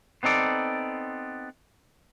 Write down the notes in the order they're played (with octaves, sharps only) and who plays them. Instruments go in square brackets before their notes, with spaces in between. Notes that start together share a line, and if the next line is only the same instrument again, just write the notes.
[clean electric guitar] B3 C4 D#4 A4 D5